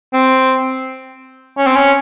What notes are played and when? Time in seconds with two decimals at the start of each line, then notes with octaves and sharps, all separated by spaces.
0.13 C4
1.57 C#4
1.67 C4
1.76 C#4